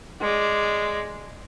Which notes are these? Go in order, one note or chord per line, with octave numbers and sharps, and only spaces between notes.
G#3 D5